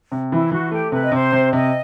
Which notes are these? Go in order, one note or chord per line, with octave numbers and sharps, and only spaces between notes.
C3
E3 E4
E3 F#4
A3 G4
C3 B4
D#5
C3 C5
C3
C3 D#5